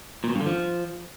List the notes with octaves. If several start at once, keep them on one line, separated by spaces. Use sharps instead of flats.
A#2
B2
G2
D3
F3